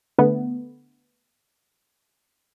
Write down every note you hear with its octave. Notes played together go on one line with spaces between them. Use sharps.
D3 A3 B3